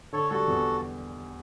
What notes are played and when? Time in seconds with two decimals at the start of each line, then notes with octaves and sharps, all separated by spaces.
0.13 D3 A4 C#5
0.30 G3 F#4 A4
0.48 E2